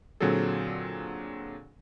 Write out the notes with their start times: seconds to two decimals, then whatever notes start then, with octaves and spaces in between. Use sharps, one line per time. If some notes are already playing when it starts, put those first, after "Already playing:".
0.20 A#2 D3 F#3 C4 G#4 A4